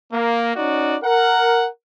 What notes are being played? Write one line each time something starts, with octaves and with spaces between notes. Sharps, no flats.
A#3
C#4 D#4 F#4 D5
A#4 F#5